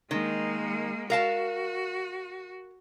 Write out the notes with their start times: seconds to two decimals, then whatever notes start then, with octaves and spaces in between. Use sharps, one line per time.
0.11 D#3 G#3 A#3
1.10 F#4 A#4 F5 A5